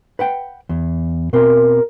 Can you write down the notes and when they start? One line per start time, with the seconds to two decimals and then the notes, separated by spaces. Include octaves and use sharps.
0.19 B4 F#5 G5
0.69 E2
1.33 B2 C4 A#4